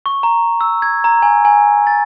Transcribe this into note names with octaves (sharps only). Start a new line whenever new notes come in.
C#6
A#5
E6
G#6
A#5
G#5
G#5
A6